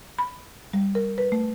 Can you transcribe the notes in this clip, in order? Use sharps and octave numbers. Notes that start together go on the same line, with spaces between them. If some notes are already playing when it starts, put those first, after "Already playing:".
B5
G3
A#4
B4
A3